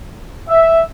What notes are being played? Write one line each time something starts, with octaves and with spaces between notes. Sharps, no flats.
E5